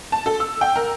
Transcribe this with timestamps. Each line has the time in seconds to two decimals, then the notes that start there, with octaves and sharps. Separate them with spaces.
0.12 A5
0.26 A4
0.40 E6
0.61 G5
0.76 A#4